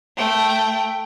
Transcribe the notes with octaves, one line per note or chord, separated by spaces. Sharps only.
A3 G5